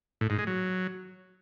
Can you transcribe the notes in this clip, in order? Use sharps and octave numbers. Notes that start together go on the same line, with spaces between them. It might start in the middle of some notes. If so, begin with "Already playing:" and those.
A2
G#2
G#3
F#3